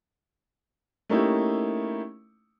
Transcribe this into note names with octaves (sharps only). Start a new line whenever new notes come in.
A3 A#3 C#4 D#4 E4 G4